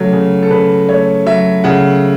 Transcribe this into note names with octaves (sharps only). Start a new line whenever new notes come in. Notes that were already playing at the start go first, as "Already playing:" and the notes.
Already playing: C#3 F#3 A3
C#3
A4
C#3 B4
A3 C#5
F#3 E5
C#3 F#5